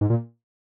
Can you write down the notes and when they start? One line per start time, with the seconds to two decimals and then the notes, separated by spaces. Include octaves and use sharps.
0.01 G#2
0.10 A#2